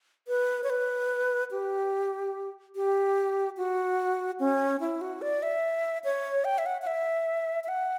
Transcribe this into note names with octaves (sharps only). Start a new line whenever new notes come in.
B4
C#5
B4
G4
G4
F#4
C#4
E4
F#4
D5
E5
C#5
G5
E5
F#5
F#5
E5
E5
F#5